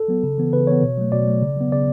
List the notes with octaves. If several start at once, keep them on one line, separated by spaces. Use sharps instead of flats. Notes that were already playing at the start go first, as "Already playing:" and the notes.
Already playing: A4
F#3 B3
C#3
E3 B3
C#3 B4
E3 B3 C#5
B2
F#3 A3
B2 D5
F#3 A3
C#3
F#3 B3
C#3 D5